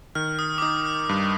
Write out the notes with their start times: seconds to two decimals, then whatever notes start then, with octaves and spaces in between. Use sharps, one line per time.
0.15 D#3 F6
0.39 D#6
0.58 D6
0.62 D#4 D#6
0.85 F6
1.09 G2